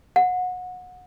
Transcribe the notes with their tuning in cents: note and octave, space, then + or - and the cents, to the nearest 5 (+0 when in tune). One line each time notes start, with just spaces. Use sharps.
F#5 -25